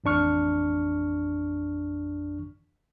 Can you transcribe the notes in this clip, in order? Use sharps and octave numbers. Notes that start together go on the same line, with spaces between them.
A1 F2 D4 C#6 F6